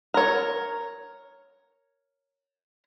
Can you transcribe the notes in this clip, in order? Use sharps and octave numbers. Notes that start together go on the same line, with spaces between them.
A#4 C#5